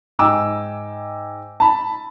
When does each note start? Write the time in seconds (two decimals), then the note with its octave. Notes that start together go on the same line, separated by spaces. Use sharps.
0.19 G#2 D#5 G5 G#5 D6 E6
1.60 A5 B5